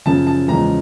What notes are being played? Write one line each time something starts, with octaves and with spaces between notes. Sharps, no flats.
F#2 C#3 F3 A5
A5
E2 C#3 F3 G#3 A#5